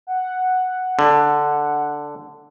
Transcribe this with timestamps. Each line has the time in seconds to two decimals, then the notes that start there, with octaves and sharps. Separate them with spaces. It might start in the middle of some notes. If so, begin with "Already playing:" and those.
0.07 F#5
0.99 D3